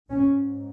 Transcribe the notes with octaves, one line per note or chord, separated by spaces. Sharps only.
G#2 C#4